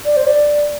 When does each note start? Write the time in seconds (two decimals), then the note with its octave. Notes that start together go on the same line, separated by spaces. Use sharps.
0.05 D5
0.17 C5
0.27 D5